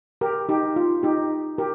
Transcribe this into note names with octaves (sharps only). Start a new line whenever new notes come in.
G4 A#4
D#4 G4
F4
D#4 G4
G4 A#4